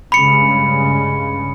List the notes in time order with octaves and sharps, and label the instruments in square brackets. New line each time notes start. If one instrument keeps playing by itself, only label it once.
[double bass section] G2 C#3 G#3 [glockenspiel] B5 C#7